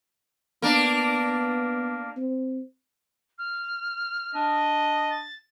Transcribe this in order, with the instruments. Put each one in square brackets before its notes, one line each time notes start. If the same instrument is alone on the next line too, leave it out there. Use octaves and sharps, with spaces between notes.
[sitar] A#3 D4 [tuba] B3
[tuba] C4
[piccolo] F6
[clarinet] D4 [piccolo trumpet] D#5
[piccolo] A6